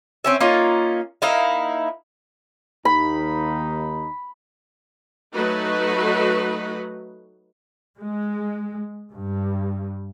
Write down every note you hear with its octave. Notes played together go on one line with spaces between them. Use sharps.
C4 C#4 E5
A#3 C#4 D#4 F4
A#3 D#4 E4 F5
D#2 D#4 B5
F#3 A3 D#4 F#4 B4
G#3
G2